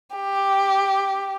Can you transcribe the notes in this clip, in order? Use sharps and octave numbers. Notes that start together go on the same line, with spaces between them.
G4